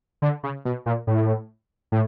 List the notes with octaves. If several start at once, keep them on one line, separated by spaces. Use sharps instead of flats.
D3
C#3
B2
A#2
A2
A2